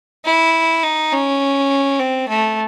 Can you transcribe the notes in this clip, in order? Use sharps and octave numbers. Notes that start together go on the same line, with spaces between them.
E4
D#4
C#4
C4
A3